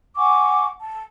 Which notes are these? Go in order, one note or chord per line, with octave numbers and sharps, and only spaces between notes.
F#5 G#5 C#6 D6
A5